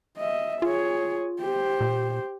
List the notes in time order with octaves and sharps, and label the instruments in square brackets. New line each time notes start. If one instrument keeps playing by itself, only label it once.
[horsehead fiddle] D#5 E5
[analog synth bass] F4 [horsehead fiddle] G#4 C#5
[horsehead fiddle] G4 C5
[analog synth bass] A#2